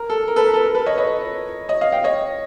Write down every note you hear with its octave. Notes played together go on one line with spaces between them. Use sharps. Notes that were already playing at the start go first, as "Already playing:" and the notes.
Already playing: A#4
A4
A#4
A4 B4
A#4
A4
A#4
A4 B4
C#5 D#5
C#5 D#5
C#5 D#5
D#5 F5
F5 G5
C#5 D#5